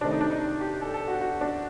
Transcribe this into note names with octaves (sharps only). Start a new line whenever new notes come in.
C3 D#3 A3 C4 D4
D#4
D4
D#4
G4
A4
A4
F#4
F#4
D4